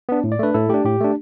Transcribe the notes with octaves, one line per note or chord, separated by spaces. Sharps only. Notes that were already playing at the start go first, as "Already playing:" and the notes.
B3 D4
A2
D5
A3 D4 B4
A2 E4 A4
A3 D4 G4
A2 G4
A3 D4